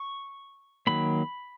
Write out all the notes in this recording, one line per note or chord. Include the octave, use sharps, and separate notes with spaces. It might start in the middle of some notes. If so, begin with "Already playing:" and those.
Already playing: C#6
D#3 F#3 A#3 B5